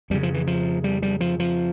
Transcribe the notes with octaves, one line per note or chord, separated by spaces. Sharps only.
F2 C#3 G3
F3
E3
F3
G3
G3
F3
F3